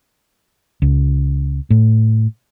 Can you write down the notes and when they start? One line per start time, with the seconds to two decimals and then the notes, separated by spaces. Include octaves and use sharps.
0.82 C#2
1.70 A2